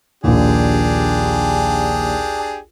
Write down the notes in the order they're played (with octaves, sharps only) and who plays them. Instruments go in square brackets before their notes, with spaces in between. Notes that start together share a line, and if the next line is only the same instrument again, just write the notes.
[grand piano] A#1 D#2 [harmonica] D4 G4 G#4